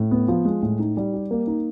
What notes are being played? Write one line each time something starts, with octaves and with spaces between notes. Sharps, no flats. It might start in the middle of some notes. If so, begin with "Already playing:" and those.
Already playing: A2
B3
F3
G#3
A2
D#4
G3
G4
A#3
D#4